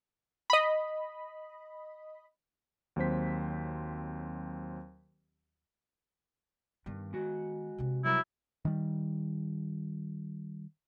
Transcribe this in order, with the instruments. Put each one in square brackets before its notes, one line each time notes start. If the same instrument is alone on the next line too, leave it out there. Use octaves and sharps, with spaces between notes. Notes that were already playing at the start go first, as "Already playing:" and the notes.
[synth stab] D#5 B5
[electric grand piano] D#2 F#3 C4 C5 B6
[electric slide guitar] G2 [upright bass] D#3 B3
[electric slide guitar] G#3 F#4
[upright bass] C3 C4
[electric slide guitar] F#3 G3 A#4 [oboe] E4
[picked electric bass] D#3 G3